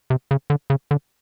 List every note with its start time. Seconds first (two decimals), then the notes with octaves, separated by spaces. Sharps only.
0.10 C3
0.31 C#3
0.50 D3
0.70 C#3
0.91 D3